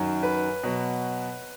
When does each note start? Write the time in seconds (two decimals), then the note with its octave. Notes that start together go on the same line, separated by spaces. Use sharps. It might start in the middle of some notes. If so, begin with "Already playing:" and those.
Already playing: F#2 D#3 F#3
0.23 B4
0.63 B2 F#3